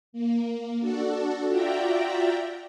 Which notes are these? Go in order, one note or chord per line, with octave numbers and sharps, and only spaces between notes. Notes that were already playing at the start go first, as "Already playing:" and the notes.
A#3
D4 F#4 A4
F4 F#4 D5 E5 G5 A#5